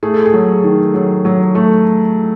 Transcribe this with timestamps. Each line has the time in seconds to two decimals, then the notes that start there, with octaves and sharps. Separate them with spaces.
0.03 A3 G#4
0.14 A4
0.26 G#4
0.34 F#3
0.64 D#3
0.94 F#3
1.25 F#3
1.55 A3